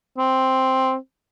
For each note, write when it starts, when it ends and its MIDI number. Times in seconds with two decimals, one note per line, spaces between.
0.18 0.95 60